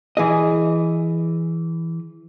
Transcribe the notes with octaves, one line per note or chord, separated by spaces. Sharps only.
E3 G#4 D#5